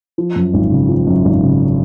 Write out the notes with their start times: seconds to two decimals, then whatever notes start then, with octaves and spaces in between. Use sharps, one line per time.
0.18 F3
0.36 F#2
0.54 G#1
0.71 C#3
0.89 F3
1.07 F#2
1.25 G#1
1.43 C#3